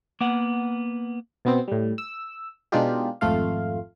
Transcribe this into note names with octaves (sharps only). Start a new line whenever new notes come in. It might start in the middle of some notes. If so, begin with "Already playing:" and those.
A#3 B3 F#5
B2 B3 C4
A2 G3
E6
B2 G#3 D4 D#4 F4 G4
G#1 F2 A3 F4 F5